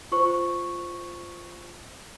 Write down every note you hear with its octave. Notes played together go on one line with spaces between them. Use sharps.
F4 C5 C#6